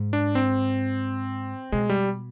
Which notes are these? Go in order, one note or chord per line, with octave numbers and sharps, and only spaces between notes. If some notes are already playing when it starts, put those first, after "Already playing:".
Already playing: G#2
D4
C4
B2 G#3
G3